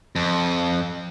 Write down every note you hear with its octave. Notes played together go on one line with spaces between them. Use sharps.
F2